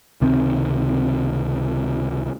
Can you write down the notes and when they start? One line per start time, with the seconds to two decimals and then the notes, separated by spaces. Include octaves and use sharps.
0.21 C#2 C3 D#3 C4